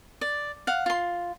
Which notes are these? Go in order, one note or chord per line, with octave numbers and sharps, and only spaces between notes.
D5
F5 F#5
F4 C6